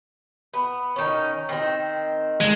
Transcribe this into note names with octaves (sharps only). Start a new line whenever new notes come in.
B3
D#3 C#4
D#3 C4
G#3